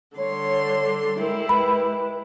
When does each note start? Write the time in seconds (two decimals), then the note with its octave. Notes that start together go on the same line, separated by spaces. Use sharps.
0.17 D3 G3 C#5 C6
1.20 G#3 E4 G4 A#4
1.49 B4 B5